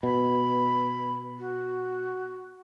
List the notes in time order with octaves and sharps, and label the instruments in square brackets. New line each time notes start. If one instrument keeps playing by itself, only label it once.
[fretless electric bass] B2 [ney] B5
[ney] F#4